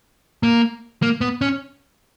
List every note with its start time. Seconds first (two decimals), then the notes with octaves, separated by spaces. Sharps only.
0.43 A#3
1.02 A#3
1.21 B3
1.41 C#4